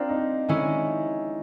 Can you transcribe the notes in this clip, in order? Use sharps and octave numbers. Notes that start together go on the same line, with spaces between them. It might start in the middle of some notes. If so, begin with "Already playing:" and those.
Already playing: C4 D4 F4 A#4
D#4
D#3 G#3 C#4 E4